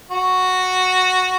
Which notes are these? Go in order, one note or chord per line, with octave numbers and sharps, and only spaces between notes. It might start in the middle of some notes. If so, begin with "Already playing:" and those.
F#4